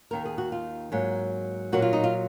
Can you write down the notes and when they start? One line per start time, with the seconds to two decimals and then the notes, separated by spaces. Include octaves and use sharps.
0.11 D#2 D#3 A#3 A#4
0.25 G#4
0.38 F#4
0.52 F4
0.92 G#2 F#3 A#3
1.72 A#2 F#3 A#3 F#4
1.82 F4
1.93 D#4
2.04 F4